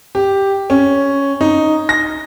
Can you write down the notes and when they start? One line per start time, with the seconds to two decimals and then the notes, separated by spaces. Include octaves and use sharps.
0.15 G4
0.70 C#4
1.41 D#4
1.89 A#6